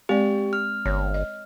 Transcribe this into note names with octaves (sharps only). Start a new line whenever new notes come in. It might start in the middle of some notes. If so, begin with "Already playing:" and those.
G#3 C4 G4 D5
F6
G1 C#5
D#5